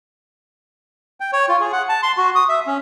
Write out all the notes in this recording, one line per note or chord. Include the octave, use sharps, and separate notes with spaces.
G5
C#5
F4
G#4
F#5
A5
C6
F#4
D#6
E5
C#4